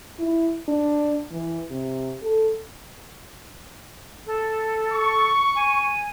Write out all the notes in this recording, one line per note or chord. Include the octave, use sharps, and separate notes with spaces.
E4
D4
E3
C3
A4
A4
C#6
G#5